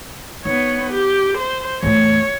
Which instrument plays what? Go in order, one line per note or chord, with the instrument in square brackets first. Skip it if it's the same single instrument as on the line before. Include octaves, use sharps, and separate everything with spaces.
[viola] B3 C#5 [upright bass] D#4
[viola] G4
C5
[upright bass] E2 A2 [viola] C#5